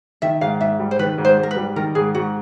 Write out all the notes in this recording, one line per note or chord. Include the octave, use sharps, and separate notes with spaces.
D#3 E5
G#2 F5
G#2 E5
G3
C5
D#3 B4
G#2
C5
G#2
A#4
B4
G3
D#3 A#4
G#2 G#4
G#2 F#4